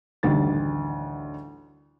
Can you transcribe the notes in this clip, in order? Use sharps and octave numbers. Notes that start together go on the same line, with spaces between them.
A1 D2 D3 D#3 G3 A6